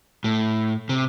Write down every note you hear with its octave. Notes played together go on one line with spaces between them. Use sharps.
A2
C3